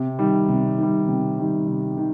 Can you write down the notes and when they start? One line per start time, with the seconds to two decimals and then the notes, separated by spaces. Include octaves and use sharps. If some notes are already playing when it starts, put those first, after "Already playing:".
Already playing: C3
0.19 D#3 G3
0.49 C3
0.79 D#3 G3
1.08 C3
1.39 D#3 G3
1.68 C3
1.98 D#3